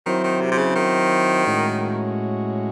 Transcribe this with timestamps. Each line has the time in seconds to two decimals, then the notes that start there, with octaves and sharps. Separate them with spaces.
0.06 D#3 F#3 C4 E4 C5
0.24 D#3
0.41 C3
0.51 C3
0.58 C#3
0.75 D#3
1.45 A2 G#3 C#4 F#4